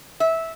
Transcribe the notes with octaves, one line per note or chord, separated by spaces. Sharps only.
E5